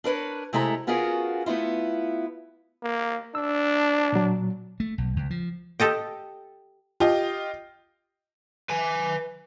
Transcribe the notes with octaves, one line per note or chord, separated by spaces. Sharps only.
D4 A#4 B4 C#5
C3 G#3 A3 E4 A4 A#5
B3 C#4 F4 F#4 G#4 A#4
A3 B3 E4 F4
A#3
D4 E6
A#2 F#3
A3
B1
C#2
F3
G4 A4 D#5 G5
F4 G4 D#5
B4 G#5